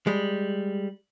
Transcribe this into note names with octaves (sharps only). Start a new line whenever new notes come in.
G3 G#3